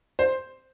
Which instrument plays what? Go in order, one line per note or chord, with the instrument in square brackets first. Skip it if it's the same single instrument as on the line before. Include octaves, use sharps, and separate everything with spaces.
[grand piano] C5